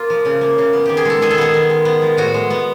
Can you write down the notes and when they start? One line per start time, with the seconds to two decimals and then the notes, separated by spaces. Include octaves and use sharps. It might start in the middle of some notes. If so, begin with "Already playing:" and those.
Already playing: A#3 F4
0.10 F3
0.25 C#3
0.41 A#3
0.58 C#3
0.73 B3
0.86 D#3 G4
0.97 G#4
1.05 G#3 A4
1.22 D#3 G#4
1.31 A4
1.38 B3 G#4
1.54 D#3
1.70 G#3
1.85 B3
2.02 F3
2.17 A2 F#4
2.34 G#3
2.50 B3